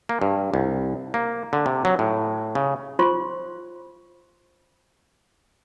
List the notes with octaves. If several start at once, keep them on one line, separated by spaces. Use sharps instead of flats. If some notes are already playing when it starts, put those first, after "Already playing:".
A#3
G2
C2
A#3
D3
C3
F#3
A2
C#3
F4 C5 C6 C#6